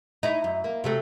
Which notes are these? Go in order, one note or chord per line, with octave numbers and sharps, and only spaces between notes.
D#4 E4 C#5
F#2
A#3
C3 F#3 A3